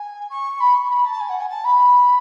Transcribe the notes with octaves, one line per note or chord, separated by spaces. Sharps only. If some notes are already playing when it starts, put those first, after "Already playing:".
Already playing: G#5
C#6
B5
C#6
C#6
B5
A5
G#5
F#5
G#5
A5
B5